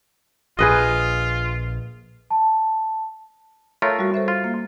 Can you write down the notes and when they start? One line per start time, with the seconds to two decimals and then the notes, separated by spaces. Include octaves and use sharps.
0.59 A#1 F4 G#4 B4 D#5
2.31 A5
3.82 A3 F4 A#4 C#5
3.99 G3 F#4
4.14 A4 C5 E5
4.28 F4
4.44 A#3